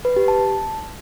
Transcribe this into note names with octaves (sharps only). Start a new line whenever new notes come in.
B4
G4
A5